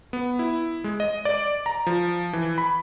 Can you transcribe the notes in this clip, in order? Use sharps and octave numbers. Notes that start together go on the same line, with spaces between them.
B3
E4
G#3
D#5
D5
A#5
F3
E3
B5